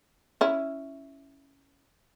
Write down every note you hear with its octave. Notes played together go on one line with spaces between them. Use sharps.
C#4 E4